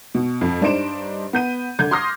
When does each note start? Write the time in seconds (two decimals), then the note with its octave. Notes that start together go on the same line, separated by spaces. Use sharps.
0.15 B2
0.41 F2
0.61 G2 D4 D#4 C5 D7 E7
1.33 B3 G6 D#7
1.79 D3 G6 G#6
1.91 C6 D6 D#6 F6 A#6 C7